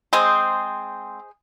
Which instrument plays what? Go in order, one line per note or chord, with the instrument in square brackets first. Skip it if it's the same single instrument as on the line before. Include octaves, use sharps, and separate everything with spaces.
[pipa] G#3 C4 [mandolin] G#4 C5 D#5